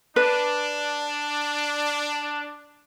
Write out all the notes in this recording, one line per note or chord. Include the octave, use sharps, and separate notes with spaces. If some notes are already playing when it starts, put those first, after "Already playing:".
D4 B4